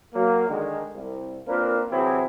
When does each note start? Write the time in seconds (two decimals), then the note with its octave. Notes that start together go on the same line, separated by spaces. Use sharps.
0.14 F#3 A#3
0.48 D3 D#3 G#3
0.96 C2
1.47 A#3 C4 D4 F4 A#4 B4
1.90 C3 E3 F#3 C4 E4 G#4